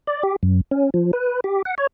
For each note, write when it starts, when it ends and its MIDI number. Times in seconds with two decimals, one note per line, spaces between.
0.07 0.23 74
0.23 0.36 67
0.43 0.61 42
0.71 0.90 61
0.94 1.11 53
1.13 1.40 71
1.44 1.62 67
1.65 1.75 78
1.78 1.87 73